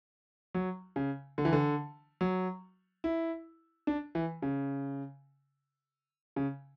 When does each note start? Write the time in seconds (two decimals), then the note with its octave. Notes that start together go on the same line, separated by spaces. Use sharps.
0.54 F#3
0.96 C#3
1.38 D3
1.45 E3
1.53 D3
2.21 F#3
3.04 E4
3.87 D4
4.15 E3
4.42 C#3
6.36 C#3